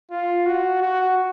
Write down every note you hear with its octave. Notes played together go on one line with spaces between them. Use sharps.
F4
F#4
F#4